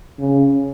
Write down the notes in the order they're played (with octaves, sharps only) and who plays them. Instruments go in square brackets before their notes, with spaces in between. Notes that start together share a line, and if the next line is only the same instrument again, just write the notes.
[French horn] C#3